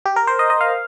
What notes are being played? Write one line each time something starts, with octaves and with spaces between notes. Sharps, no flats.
G4
A#4
C5
D#5
D#5
F5